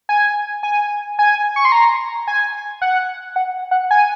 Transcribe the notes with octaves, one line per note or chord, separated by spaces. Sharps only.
G#5
G#5
G#5
C#6
C6
A#5
G#5
F#5
F#5
F#5
G#5